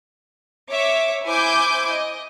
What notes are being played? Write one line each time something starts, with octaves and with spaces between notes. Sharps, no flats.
C#5 E5 D6
E4 C5 G#5 D6 G6
D#5